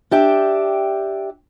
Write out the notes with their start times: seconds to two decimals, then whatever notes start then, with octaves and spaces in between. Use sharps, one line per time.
0.11 D4 G4 E5 G5